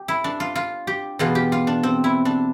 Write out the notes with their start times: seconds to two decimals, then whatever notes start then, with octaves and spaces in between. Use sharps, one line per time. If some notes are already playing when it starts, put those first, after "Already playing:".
Already playing: G4
0.08 E4
0.24 D4
0.40 F4
0.56 F4
0.87 G4
1.19 E2 B2 F4
1.35 G4
1.52 F4
1.67 D4
1.83 C4
2.04 E4
2.25 D4